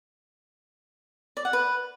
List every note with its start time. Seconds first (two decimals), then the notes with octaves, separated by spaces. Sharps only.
1.37 D5
1.45 F#5
1.53 B4